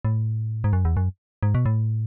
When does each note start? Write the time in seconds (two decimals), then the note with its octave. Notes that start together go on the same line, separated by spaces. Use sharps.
0.05 A2
0.64 G#2
0.73 F#2
0.85 E2
0.97 F#2
1.43 G#2
1.55 B2
1.66 A2